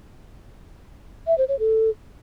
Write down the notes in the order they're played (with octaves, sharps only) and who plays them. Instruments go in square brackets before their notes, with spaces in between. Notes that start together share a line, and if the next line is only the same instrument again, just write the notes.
[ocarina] E5
C5
C#5
A4